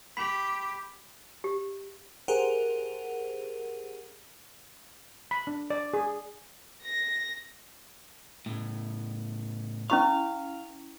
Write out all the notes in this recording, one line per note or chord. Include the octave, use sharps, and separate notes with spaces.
G4 B5 B6
G4
G4 G#4 A#4 C5 F#5
B5
D4
D5
G#4
A#6
A2 C#3
C#4 E4 F5 C#6